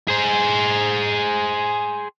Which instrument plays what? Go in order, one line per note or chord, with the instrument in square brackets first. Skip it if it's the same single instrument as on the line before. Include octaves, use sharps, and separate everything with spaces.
[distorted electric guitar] G#4 C5